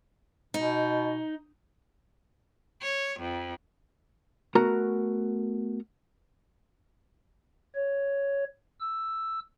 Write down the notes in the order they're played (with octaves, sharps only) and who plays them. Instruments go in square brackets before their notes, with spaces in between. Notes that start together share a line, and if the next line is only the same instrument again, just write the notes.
[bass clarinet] B2 [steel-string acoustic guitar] D#4
[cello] C#5
F2
[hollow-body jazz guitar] A3 B3 F#4 A#4 A#5
[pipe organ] C#5
E6